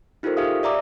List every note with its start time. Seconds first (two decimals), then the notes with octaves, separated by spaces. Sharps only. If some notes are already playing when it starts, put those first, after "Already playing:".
0.23 D#4 F4 G4 A4 A#4 C5
0.37 G4 G#4 E5 F5 D#6
0.63 D5 E5 A#5 D6